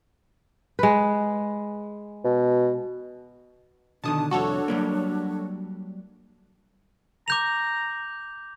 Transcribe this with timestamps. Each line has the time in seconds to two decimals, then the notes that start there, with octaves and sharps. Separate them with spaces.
0.79 G#3 B4
2.24 B2
4.04 B2 D3 D#3 D4 A5 D#6
4.31 C2 F2 D4 F#4 A4 C#5
4.68 F#3 G3 A#3
7.28 A#5 D6 G6 F7